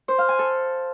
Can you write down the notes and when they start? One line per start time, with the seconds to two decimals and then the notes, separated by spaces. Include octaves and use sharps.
0.08 C5
0.19 F5
0.29 G#5
0.39 A4